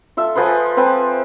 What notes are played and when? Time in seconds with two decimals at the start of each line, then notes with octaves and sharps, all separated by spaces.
0.17 F4 A4 E5
0.35 F3 G#4 B4 C6
0.77 C4 B4 G#5 A5